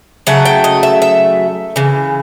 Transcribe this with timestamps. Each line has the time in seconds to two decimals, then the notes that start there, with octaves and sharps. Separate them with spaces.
0.27 C#3 F#3 A3 F#5
0.45 G5
0.64 D#5
0.83 E5
1.02 E5
1.76 C#3 E3